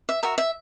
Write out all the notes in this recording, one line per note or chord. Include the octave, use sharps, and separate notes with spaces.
E5
F#4 A#4 E5
E5